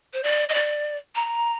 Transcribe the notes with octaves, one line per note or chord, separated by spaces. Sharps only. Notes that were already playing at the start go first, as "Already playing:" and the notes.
C5
D5
D#5
D5
A#5